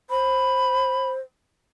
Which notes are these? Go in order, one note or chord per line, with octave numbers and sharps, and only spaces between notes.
C5 B5